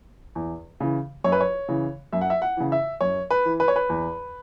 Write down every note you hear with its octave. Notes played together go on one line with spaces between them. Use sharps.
E2
C#3 E3
F#2 C#5
B4
C#5
C#3 E3
F#2 E5
F#5
E5
F#5
C#3 E3
E5
F#2 C#5
B4
E3
B4
C#5
B4
E2